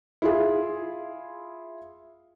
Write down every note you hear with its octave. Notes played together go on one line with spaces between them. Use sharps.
E4 F4 G#4